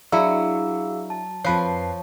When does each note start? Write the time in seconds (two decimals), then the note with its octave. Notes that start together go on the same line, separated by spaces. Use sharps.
0.12 F#3 D4 E4 G#4 F5 E6
1.10 A5
1.45 F2 F3 B4 C#5 A5 C7